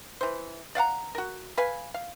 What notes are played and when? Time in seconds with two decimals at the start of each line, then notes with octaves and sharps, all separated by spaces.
0.21 E3 C5
0.75 D5 F5 F#5 A#5
1.15 F#4 A#4
1.57 B4 F5 G#5
1.94 F5